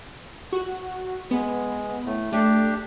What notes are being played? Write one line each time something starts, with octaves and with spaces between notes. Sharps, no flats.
F#4
G#3 B3
A2 A3
A3 D4 G4